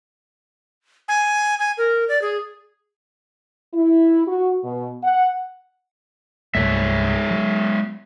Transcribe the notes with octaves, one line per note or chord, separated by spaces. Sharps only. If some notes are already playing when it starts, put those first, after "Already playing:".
G#5
G#5
A#4
D5
G#4
E4
F#4
B2
F#5
C2 G2 G#3 A3 C#5 E5
F#3